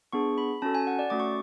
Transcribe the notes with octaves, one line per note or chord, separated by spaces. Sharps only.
B3 D4 G#4 C#6
B5
C#4 F#4 A4 A5
G#5
F#5
D5
A3 C#4 F#4 D6
C#6